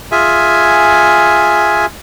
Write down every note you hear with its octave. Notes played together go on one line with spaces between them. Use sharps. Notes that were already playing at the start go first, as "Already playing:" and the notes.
F4 G#4 E5 G#5